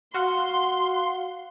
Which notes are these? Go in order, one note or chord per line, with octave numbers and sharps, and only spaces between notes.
F#4 F5 F#5 C6